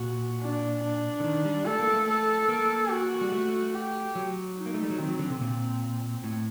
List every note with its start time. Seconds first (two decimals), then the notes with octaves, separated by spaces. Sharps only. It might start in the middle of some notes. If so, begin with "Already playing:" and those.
Already playing: A#2 F#4
0.42 D4
0.83 D4
1.20 D3
1.24 D#3
1.45 G3
1.67 A3 A4
1.79 A#3
1.94 A3
2.07 A4
2.49 A#3
2.91 F#4
3.21 G3
3.32 A3
3.75 G4
4.15 F#3
4.57 D#4
4.66 A#3
4.74 A3
4.82 G3
4.90 F#3
4.98 D#3 C4
5.09 F#3
5.19 D3
5.30 C3
5.40 A#2
6.24 A2